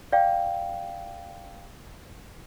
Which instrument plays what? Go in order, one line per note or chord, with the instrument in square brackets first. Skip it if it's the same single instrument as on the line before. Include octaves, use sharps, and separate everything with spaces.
[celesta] D5 F5 G5